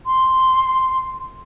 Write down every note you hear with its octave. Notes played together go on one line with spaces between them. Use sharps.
C6